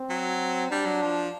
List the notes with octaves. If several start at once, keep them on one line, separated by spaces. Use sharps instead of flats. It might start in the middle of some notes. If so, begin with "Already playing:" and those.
Already playing: C4
F#3
G3 D4
F#3
F3